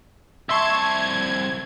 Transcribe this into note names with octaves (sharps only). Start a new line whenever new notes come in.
C2 E5 A5 C6 C#6 G#6